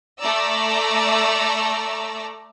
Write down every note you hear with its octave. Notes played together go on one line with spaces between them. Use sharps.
A3 D5 A#5 E6